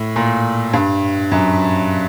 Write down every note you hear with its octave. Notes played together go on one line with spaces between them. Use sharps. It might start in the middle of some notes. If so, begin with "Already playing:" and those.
Already playing: A2
A#2
G2
F#2